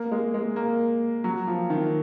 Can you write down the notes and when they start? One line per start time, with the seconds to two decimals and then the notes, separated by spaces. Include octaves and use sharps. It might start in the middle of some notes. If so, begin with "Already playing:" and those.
Already playing: A#3
0.12 G#3
0.34 G#3
0.56 A#3
1.24 F#3
1.47 F3
1.70 D#3